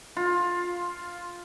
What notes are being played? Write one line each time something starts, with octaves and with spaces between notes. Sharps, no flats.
F4